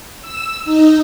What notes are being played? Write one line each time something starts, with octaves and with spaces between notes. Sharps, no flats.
E6
D#4